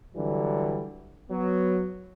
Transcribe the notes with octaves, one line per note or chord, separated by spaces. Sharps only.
D3 E3 F#3 G3
F#3 B3